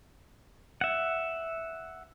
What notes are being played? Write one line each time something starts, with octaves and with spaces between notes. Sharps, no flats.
E5 F#5